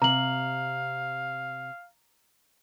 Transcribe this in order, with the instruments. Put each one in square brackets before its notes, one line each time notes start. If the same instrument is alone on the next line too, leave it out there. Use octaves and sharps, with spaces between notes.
[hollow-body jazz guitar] C3 [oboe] F5 [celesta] A#5 F#7